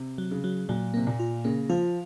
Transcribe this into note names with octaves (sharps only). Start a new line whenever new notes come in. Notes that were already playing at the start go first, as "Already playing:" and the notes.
Already playing: C3
F#3
C#3
F#3
A#2 F#3
C3 A#3
A#2
F4
C#3 A#3
F3 F4